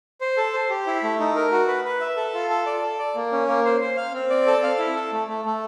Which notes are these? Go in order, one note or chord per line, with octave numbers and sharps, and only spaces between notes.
C5
A4
C5
G4
E4
A3
D#4
A#4
F#4
B4
B4
E5
A4
F4
A4
D5
A4
D5
A#3
C#4
A#3
C5
C5
F5
C4
D5
A4
F5
E4
A4
A3
A3
A3